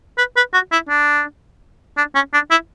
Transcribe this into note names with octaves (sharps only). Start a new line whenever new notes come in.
B4
B4
F#4
E4
D4
D4
C#4
D4
E4